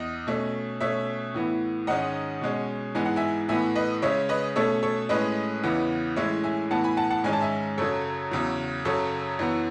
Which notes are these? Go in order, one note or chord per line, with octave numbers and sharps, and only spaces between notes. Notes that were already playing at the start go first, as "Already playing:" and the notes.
Already playing: E2 D#5
B2 A3 C#4
B2 A3 C#4 C#5 E5
A2 E3 B3
G#2 D#3 G#3 C#4 D#5 F#5
B2 G#3 C#4
G#2 E3 G#3 B3 G#5
F#5
E5 G#5
A2 E3 B3 E5 G#5
B4 D#5
C#3 G#3 C#4 C#5 E5
B4 D#5
B2 A3 C#4 A4 C#5
A4 C#5
A2 G#3 C#4 B4 D#5
E2 C#3 E3 B3
A2 E3 G#3 C#4 C#5 E5
E5 G#5
A2 E3 B3 F#5 A5
G#5 B5
F#5 A5
F#5 A5
G#2 D#3 G#3 C#4 G#5
A5
E5 G#5
F#2 C#3 F#3 A4 C#5
E2 C#3 F#3
F#2 C#3 F#3 A4 C#5
F#2 E3 B3